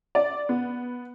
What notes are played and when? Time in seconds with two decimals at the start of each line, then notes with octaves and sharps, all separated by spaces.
0.15 D5
0.49 B3